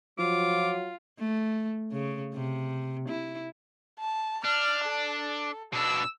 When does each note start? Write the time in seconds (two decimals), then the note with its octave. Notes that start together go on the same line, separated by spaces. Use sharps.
0.18 F3 F#3 F4 D6
1.19 A3
1.92 C#3
2.34 C3
3.09 E4
3.99 A5
4.45 D4 F6
4.85 A4
5.73 B2 D4 E6